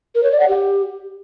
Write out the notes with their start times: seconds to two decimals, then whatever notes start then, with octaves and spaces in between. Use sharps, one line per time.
0.15 A#4
0.23 C#5
0.32 D5
0.40 F#5
0.48 G4